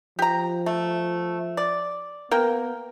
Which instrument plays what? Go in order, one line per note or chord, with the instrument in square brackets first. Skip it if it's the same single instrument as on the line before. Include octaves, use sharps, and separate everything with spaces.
[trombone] F3 [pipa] G4 A#5
[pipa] A3
D5
[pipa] A#3 A#4 G5 [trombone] B3